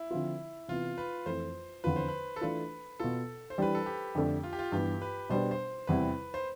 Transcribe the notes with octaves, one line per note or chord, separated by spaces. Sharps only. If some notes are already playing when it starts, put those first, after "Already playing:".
Already playing: E4
D3 F3 C4 F4
C3 E3 B3 F4
B4
F2 E3 A3 C5
E2 D3 F3 C4 F4 B4
C5
B4
A4
E3 A3 D4 F4 B4
B2 B3 F4 A4
C5
E3 G3 D4 G4 B4
A4
G4
F2 D3 A3 D4
F4
G4
F4
G2 E3 B3 G4
B4
B2 G3 B3 D4 G4 C5
C5
E2 C3 G3 C4 E4 B4
C5